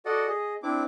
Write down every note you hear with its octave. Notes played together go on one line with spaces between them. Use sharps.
F#4 A4 D5 D#5 F#5
G#4 D#5
C4 D4 E4 D6